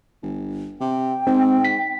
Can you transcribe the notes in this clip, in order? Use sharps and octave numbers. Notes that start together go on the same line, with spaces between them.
G1
C3 G5
G#2 C4
B6